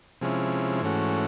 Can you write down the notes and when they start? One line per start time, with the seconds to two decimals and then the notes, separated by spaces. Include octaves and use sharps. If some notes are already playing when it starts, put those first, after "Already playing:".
0.21 C3 F3 G#3 C#4 E4
0.82 G#2 E3 A3 C#4 F#4